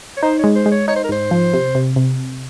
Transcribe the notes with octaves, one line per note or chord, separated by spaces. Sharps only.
C#5
D#4 C5
C#5
G#3
C5
G#3
C#5
D#4 C#5
C5
A#4
G#2 C5
F3
C3
C3
C3